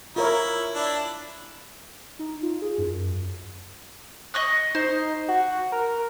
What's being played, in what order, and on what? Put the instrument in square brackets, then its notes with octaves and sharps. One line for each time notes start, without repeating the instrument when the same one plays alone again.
[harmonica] E4 [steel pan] F4 A#4 C#5
[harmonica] D4 E4
[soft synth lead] D#4
F4
G#4
F#2
[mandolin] D#5 C#6 F#6
[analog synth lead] D#4 [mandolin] C5
[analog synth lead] F#4
A#4